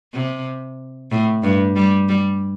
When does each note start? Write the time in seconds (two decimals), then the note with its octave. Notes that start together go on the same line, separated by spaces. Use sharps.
0.14 C3
1.11 A2
1.43 G2
1.76 G3
2.09 G3